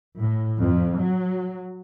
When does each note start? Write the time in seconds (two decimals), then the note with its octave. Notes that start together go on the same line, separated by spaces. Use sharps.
0.18 A2
0.60 F2
0.98 F#3